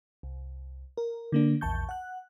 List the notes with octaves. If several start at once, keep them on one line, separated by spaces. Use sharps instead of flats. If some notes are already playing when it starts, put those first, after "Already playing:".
C2
A#4
D3 A#3 D4
A#1 E2 A5 C#6 G6
F#5 F#6